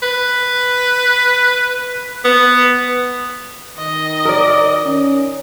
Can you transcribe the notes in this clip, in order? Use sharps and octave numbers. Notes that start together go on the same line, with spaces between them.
B4
B3
D#3 D#5
A#4 D5
C#4